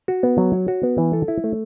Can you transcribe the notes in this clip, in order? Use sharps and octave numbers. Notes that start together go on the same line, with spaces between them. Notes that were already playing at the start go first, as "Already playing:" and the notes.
F#4
B3
F#3
C#5
F#4
B3
E3
A4
E4
A3